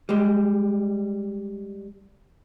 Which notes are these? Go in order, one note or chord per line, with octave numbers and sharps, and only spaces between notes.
G3 G#3